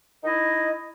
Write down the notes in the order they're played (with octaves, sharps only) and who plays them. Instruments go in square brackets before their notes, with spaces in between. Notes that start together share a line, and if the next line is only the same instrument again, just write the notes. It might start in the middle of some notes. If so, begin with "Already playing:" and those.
[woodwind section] D#4 E4 D#5